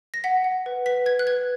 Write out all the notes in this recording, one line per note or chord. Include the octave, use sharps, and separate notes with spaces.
A#6
F#5 B6
F#5
B4
B4 B6
B4 G#6
F#6
B4 G#6